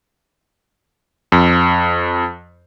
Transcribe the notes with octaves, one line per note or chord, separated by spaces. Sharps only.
F2